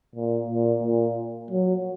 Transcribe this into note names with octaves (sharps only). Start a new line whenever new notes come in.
A#2
A#2
A#2
F#3